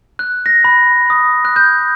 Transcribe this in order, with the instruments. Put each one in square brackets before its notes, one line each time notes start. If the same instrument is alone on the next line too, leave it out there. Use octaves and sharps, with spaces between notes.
[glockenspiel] F#6
A#6
B5
D#6
F#6
G6